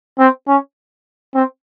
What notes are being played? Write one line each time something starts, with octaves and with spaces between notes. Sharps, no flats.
C4
C#4
C4